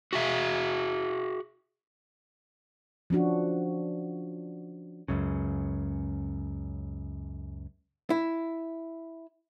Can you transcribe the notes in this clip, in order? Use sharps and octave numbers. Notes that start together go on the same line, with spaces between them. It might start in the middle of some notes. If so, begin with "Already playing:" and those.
F#4 G#4 E5
F3 C#4 D4 F#4
C#2 F#2 C#3
E4